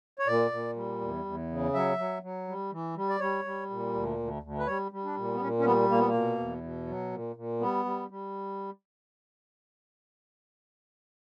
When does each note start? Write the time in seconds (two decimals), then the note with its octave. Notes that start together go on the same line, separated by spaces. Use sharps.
0.19 C#5
0.27 A#2 D5
0.51 A#2
0.76 G3
1.01 E2
1.25 E2
1.50 C#3
1.74 F#3 E5
1.98 F#3
2.22 F#3
2.48 G3
2.72 E3
2.96 G3
3.09 D5
3.20 G3 C#5
3.45 G3
3.70 A#2
3.94 D2
4.19 D2
4.43 D2
4.59 B4
4.67 G3 C#5
4.92 G3
5.05 D4
5.16 A#2
5.34 B3
5.41 A#2 C#4
5.59 C#4
5.65 G3 B3
5.90 A#2 A#3
5.98 B3
6.08 A#3
6.14 B2
6.39 E2
6.63 B2
6.87 F#3
7.12 A#2
7.36 A#2
7.60 G3 B3
7.85 G3
8.10 G3